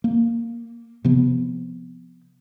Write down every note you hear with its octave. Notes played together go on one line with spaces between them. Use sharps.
A#3
C3 F3 B3